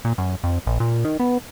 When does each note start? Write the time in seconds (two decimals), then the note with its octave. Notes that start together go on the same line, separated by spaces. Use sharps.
0.05 A#2
0.18 F#2
0.44 F2
0.67 A#1
0.80 A#2
1.04 D#3
1.20 B3